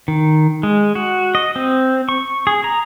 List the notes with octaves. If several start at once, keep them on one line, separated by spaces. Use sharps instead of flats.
D#3
G#3
F#4
D#5
C4
C#6
G#4
A#5